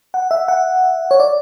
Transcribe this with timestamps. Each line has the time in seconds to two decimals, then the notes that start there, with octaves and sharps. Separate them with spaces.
0.14 F#5
0.31 E5
0.48 F#5
1.11 C#5
1.20 D5